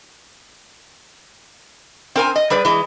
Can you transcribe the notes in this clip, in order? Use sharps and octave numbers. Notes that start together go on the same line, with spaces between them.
C4 A#4 G#5
D#5
G3 G#4 B4 D5
E3 G#3